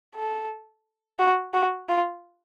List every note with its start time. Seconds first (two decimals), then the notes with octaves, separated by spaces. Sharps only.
0.15 A4
1.19 F#4
1.53 F#4
1.89 F4